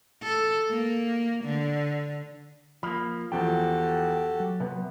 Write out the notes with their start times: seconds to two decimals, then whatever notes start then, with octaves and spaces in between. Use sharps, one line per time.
0.23 A4
0.70 A#3
1.45 D3
2.83 F3 A#3 B5
3.32 E2 F3 F#4 G4 A4 G5
4.40 F#3
4.60 C3 B3